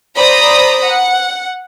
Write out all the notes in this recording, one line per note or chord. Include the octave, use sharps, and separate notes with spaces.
C5 D5 A#5 B5 D#6 A#6
F#5